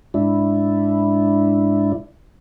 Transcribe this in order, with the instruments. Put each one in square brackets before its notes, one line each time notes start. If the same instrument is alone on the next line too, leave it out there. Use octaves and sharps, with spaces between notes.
[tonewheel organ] G#2 D4 E4